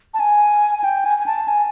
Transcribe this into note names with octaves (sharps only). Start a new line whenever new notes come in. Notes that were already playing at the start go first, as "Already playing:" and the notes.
A5
G#5
G#5
G5
G#5
G#5
A5
G#5